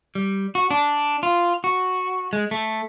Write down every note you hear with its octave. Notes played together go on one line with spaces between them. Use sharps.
G3
F#4
D4
F4
F#4
G#3
A3